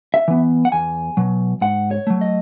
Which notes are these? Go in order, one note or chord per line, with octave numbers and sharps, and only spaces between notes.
E5
E3 B3
F#5
E2 G#5
B2 F#3
G#2 F#5
C#5
F#3 A3
D#5